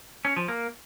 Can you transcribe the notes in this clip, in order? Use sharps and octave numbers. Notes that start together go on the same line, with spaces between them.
C#4
F3
A#3